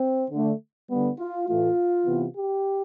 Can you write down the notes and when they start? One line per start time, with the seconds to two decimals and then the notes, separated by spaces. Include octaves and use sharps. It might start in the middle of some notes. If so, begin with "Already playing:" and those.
Already playing: C4
0.31 D3 A3
0.89 D3 G3 B3
1.18 F4
1.48 A2 E3 A3 F4
2.06 C3 E3 B3
2.36 G4